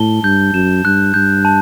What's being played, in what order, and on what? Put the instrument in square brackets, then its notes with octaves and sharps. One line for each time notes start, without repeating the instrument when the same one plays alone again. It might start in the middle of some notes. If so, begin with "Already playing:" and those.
Already playing: [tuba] A2 [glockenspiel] A5 G7
[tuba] G2 [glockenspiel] G6
[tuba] F#2 [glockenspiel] E7
[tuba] G2 [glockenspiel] F#6
[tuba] G2 [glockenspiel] G6
[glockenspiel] A5